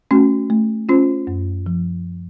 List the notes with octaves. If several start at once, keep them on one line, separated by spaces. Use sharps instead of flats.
A3 C#4 F#4
A3
C#4 F4 C5
F#2
F3